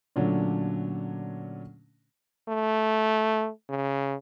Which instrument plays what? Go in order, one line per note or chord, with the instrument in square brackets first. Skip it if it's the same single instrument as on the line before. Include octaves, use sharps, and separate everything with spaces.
[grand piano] A#2 D3 F#3 A3 C#4 D4
[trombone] A3
C#3